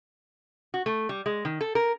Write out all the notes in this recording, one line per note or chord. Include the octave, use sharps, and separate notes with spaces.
F#4
A3
G3
G#3
D#3
A4
A#4